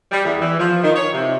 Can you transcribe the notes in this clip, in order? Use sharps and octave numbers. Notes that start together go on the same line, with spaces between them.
G3
E2
E3
F3
D#3
C#5
C3